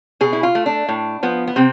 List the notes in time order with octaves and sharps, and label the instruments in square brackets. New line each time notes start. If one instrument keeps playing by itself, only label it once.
[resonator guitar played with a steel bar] B2 G#4
E4
F4
A3
D4
A2
F3 B3
B3
C3 C4